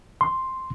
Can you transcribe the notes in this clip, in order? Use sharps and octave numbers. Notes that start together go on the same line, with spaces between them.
C6